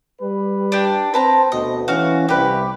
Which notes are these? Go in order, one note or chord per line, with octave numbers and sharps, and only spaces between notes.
G3 B4
D4 G4
C4 B4 C5 A5 A#5
D2 B2 D#5
E3 C#4 F#4 F5
C2 G4 B4